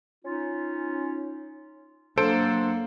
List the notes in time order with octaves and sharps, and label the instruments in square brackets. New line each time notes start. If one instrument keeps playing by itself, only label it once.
[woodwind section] C#4 D#4 F4
[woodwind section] F#3 D4 [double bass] A#3 [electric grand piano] A4 C5 D7